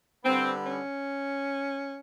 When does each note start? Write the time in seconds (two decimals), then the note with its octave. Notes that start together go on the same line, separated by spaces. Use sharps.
0.25 D3 G3 B3 C4
0.64 C#4